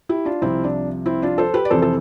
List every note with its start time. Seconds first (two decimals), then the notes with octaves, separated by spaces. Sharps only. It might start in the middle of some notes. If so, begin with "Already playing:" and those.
0.09 E4 G4
0.25 D4 F4
0.42 C2 C3 F3 C4 E4
0.64 D4
1.06 C4 E4
1.22 D4 F4
1.38 A4 C5
1.54 G4 B4
1.65 D5
1.71 F2 C3 E3 A4 C5
1.82 A4